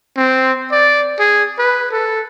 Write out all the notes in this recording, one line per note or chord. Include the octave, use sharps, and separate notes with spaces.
C4
D5
G#4
B4
A4